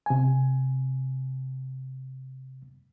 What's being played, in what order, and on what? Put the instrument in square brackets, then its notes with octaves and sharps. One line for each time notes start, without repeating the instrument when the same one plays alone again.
[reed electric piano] C3 G#5